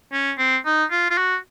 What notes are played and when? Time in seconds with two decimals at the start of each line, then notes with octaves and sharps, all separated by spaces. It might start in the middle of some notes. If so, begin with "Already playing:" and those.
0.13 C#4
0.38 C4
0.66 D#4
0.91 F4
1.10 F4
1.17 F#4